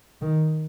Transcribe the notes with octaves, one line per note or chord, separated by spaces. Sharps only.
D#3